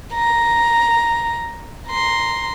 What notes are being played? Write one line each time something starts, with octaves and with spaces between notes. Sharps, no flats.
A#5
A#5 C6